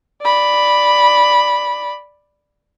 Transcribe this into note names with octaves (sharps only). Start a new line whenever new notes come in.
D5 B5